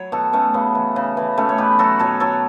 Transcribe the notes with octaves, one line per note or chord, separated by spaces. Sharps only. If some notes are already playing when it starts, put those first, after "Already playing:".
Already playing: F#3 C#5
B2 F#4 A4
B2 A3 C#4
C#3 B3
E3
C#3
E3
B2 A3 C#4
C#5
B2 G4 B4
F#3 F#4 A4
B2 A4 C#5
F#3 A4 C#5